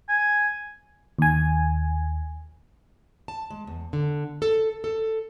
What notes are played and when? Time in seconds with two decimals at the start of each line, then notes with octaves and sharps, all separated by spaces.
0.09 G#5
1.19 D#2 G#5
3.28 A5
3.50 G#3
3.67 E2
3.93 D3
4.42 A4
4.84 A4